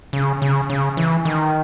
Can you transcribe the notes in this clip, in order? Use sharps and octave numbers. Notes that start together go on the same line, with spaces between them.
C#3
C#3
C#3
E3
D#3